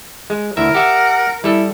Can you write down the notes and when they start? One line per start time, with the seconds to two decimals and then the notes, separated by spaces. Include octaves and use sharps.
0.30 G#3
0.57 D2 E4 A#4 E5
0.75 G4 E5 F#5
1.44 G3 E4 A4